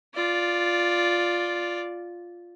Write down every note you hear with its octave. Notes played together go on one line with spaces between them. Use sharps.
F4 D5